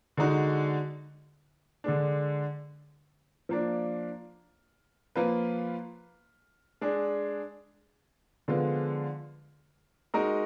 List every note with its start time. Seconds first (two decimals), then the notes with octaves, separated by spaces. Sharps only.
0.17 D3 G#3 D#4 F#4
1.84 D3 G#3 D4
3.49 F3 A#3 D4
5.16 F3 A#3 F4 B4
6.81 G#3 D4 G#4
8.48 D3 F3 G#3 B3 F4
10.14 G#3 D#4 F#4 A#4 D#5